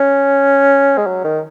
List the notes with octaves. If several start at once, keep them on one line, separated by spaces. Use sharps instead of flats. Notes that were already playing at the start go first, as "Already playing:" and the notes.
Already playing: C#4
G#3
F#3
D#3